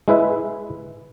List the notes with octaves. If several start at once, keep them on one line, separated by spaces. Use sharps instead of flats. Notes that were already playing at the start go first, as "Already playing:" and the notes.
G#3 E4 B4 E5